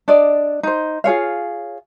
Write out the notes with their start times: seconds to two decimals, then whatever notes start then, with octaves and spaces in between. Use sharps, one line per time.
0.08 D4 D5 D#5
0.63 D#4 C5
1.04 F4 G#4 C#5 F5